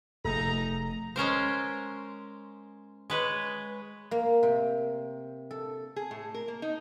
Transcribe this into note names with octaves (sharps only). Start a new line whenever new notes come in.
F1 A3 D#4 G#4 A4 A#5
G#3 C#4 A#4 C5
G#3 B4 C#5
A#3
C3
A4
G#4
A2
A#4
A#3
D#4